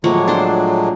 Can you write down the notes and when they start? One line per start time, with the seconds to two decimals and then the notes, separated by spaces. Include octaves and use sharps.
0.04 A2 F3 F#3 G#3 A#3 C#5
0.27 D4 C5